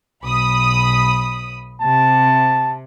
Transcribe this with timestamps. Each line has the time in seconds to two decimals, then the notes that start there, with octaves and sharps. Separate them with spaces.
0.24 B1 B5 D#6
1.81 C3 A5